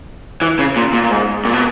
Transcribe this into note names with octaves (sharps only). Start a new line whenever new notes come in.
E3
C#3
A#2
A#2
A#2
G#2
A#2
B2